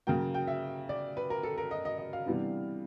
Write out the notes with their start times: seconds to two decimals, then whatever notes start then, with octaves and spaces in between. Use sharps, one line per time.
0.07 C#3 F#3 A#3 G5
0.34 G5
0.47 E5
0.89 D5
1.17 B4
1.30 A#4
1.43 A4
1.58 A#4
1.71 D#5
1.85 D#5
1.98 D#5
2.13 F5
2.26 C3 E3 G3 B3 D4